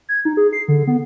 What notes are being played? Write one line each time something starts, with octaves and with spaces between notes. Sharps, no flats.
G#6
D#4
G#4
C7
D3
B3